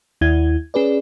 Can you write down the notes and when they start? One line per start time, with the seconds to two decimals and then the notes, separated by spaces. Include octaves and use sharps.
0.21 D#2 E4 G#6
0.74 C#4 G#4 B4 D5